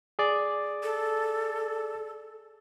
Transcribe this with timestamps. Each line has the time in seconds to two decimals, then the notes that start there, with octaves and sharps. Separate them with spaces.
0.19 G#4 D5
0.83 A4